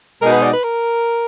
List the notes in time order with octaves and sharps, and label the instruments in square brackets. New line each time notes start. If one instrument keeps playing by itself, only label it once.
[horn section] B2 G#3 D#4 F#4 [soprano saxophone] A#4
[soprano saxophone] B4
D5
B4
A#4